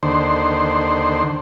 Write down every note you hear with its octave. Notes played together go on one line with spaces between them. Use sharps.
D#2 D3 C5